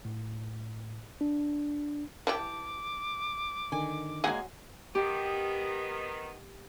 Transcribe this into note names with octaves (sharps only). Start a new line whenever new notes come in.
A2
D4
E3 E4 G4 A5 D6
D3 D#3 G#5
F#3 G#3 A#3 G#4 F#5 G#5
D#3 B3 G4